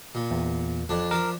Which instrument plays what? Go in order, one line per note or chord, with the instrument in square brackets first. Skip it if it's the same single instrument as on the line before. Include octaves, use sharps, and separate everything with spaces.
[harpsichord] A#2
[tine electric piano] E2
[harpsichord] F2 D4
[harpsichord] F3 D4 [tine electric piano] A#4